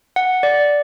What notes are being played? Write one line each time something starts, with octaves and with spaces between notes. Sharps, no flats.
F#5
D5